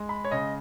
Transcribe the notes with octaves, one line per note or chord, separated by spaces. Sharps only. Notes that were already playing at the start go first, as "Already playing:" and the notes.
Already playing: G#3
B5
C#5
C#3 D#5